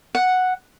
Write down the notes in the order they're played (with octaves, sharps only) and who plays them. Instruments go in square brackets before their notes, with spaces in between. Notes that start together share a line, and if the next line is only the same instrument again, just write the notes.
[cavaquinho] F#5